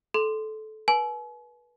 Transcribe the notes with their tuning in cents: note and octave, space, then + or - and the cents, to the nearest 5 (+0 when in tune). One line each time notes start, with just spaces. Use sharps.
A4 -20 C6 -10
B4 -30 G#5 +40